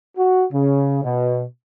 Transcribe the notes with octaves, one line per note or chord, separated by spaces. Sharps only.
F#4
C#3
B2